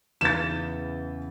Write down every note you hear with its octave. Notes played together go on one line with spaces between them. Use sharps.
E2 C#3 E3 A6 E7